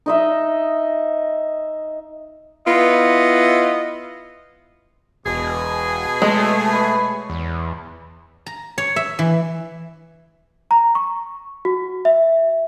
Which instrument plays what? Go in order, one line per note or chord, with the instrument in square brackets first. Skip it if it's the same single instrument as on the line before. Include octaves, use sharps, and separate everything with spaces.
[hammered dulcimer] D#4 D#5 E5
[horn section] B3 E4 F4 D#5
[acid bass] E1 [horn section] B2 G#4
[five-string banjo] G#3 [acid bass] A3 [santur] C#5 A5 C#6
[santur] B4 C#6
[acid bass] E2
[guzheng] A#5
C#5
E5
E3
[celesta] A#5
C#6
F#4
E5